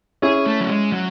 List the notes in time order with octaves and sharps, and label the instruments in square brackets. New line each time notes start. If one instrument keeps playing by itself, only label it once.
[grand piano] C#4 E4 [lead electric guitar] G#4
[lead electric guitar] A3
F#3
G#3
F#3